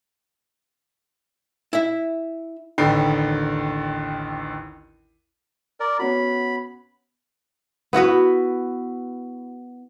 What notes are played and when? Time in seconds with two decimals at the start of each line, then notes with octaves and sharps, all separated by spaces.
1.73 E4 E5
2.78 A1 D#2 D3 G5 B5 C7
5.80 A#4 D5
5.99 B3 C#4 F#4 B5
7.93 B3 E4 F#4 B4